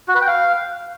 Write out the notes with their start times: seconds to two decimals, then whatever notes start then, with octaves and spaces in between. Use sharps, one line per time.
0.08 F#4
0.15 B4
0.21 G5
0.28 F5